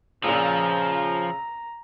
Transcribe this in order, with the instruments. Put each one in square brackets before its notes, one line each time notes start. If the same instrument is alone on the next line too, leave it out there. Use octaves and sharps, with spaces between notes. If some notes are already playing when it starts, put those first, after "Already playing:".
[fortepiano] A#1 A#2 [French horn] C#3 [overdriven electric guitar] F3 [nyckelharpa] A#5